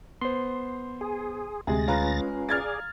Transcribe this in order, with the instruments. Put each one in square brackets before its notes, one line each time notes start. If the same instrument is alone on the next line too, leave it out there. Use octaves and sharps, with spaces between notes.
[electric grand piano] B3 C5 [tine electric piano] C6
[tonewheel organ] G#4
[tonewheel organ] D2 A6 A#6 [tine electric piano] C3 [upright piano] G#3 G#4
[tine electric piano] C#4 F4 B4 [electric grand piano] F5 A#5
[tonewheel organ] G#4 D5 [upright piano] F6 G#6 A6